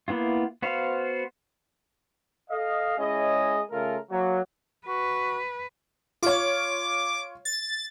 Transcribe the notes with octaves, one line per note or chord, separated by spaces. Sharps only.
A#3 B3 E4 F4
B3 F#4 C5 F5
A4 D#5 F5
G#3 C#4 E4 G#4 C#5 D#5
C#3 A3 F4 A4 A#4
F#3 A#3
F#4 B4
F4 C#5 D6
A6